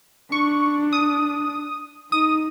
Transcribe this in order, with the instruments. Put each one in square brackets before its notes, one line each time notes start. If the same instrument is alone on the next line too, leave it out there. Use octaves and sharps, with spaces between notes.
[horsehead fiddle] D4 [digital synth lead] C#6
[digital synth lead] D#6
[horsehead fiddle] D#4 [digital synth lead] D#6